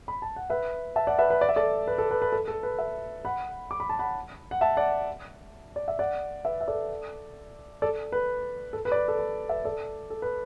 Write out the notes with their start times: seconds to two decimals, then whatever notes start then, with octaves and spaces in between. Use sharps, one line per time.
0.08 B5
0.22 A5
0.36 F#5
0.50 B4 E5
0.96 E5 A5
1.07 D5 F#5
1.19 B4 E5
1.30 B4
1.41 D5
1.49 E5
1.56 A4 D5
1.87 B4
1.98 A4
2.11 B4
2.22 B4
2.32 A4
2.48 A4
2.63 B4
2.78 B4 E5
3.25 F#5 B5
3.71 D6
3.80 B5
3.89 A5
3.99 F#5 B5
4.51 F#5
4.61 E5 A5
4.77 D5 F#5
5.76 D5
5.88 E5
5.99 D5 F#5
6.45 B4 E5
6.61 E5
6.68 A4 D5
7.82 A4 D5
8.12 B4
8.73 A4
8.85 B4
8.92 D5
8.96 B4
9.08 A4
9.19 B4
9.49 B4 E5
9.65 A4 D5
10.10 A4
10.22 B4